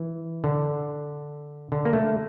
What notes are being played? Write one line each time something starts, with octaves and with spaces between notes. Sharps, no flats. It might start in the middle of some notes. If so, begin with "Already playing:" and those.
Already playing: E3
D3
D3
A#3
A3